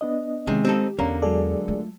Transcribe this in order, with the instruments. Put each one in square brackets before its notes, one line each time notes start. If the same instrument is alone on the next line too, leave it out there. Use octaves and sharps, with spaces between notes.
[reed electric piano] B3 D4 D#5
[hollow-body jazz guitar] C3 G#4 [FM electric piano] D#3 C#4 [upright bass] G#3
[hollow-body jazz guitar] C4 D#4 A4 [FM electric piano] G4
[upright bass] E2 [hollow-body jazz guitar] D3 A#3 [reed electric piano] C#4 A#5
[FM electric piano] F#3 G#3 A4 [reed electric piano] G#4 D5
[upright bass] A3 F4